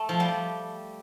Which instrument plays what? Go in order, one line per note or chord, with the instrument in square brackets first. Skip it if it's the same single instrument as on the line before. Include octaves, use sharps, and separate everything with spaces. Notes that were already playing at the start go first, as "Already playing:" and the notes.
Already playing: [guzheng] A3
F3
G3